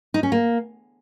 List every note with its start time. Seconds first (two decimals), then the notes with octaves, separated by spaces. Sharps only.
0.14 D#4
0.23 C#4
0.32 A#3